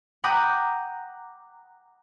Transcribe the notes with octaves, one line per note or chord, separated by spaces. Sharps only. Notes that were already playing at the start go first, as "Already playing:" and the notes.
F#5 G5 A#5 B5 D6 D#6